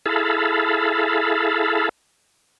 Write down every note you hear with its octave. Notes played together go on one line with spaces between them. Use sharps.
E4 G#4 A4 F5 A5 B5